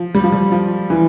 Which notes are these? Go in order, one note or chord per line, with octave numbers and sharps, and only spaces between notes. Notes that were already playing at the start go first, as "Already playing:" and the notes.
Already playing: F3
G3
F3
G3
F3
E3